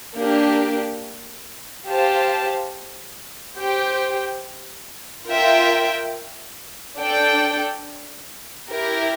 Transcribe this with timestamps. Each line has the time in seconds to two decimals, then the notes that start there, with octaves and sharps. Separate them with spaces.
0.17 A#3 D4 G4
1.87 G4 C5 F5 A5
3.58 G4 C5 G5
5.28 F4 A#4 E5 G5
6.98 D4 A4 D5 G5
8.69 E4 G4 A#4